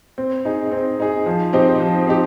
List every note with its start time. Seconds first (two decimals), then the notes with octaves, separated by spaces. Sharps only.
0.18 C4
0.45 D#4 G#4
0.72 C4
1.00 D#4 G#4
1.26 F3
1.53 C4 D#4 G4 C5
1.80 F3
2.07 C4 D#4 G4